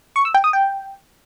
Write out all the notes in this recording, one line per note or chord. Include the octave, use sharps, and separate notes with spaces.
C#6
E6
G5
D#6
G5